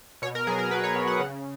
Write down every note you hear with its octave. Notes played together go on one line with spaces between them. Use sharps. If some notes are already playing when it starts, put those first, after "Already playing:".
B2 C#5
A#4
F#3 B3 G#4
A#4
B2 B4
C#5
F#3 B3
F#5
C#3